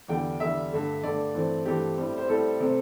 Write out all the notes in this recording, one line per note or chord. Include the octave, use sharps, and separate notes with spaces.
E2 D3 G3 G5
E2 D3 G3 E5
G2 D3 A3
G2 D3 A3 D5
G2 E3 A3 C4
G2 E3 A3 C4 G4
A2 G3 C4
C5
A2 G3 C4 A4
C3 A3 C4